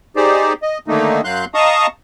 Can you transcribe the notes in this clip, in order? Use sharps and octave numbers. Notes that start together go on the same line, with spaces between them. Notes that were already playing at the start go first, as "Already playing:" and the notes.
D#4 G4 G#4 C5 D5
D#5
D3 D#3 A3 A#3 D#4
F#2 F#3 F5 C6 F#6 G6
D#5 F5 A5 A#5 C#6 D#6